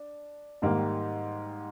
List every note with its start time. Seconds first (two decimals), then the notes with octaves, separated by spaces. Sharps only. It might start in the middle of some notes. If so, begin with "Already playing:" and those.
Already playing: D4
0.62 G#2 D#3 G3 A#3